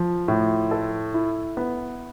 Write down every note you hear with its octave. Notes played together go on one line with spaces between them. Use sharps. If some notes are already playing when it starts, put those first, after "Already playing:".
Already playing: F3
A2
A4
E4
B3